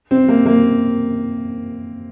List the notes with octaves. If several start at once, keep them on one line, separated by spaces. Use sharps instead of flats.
C4
A#3
A#3